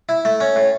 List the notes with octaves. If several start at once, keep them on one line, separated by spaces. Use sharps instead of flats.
E4
A3
C#4
A2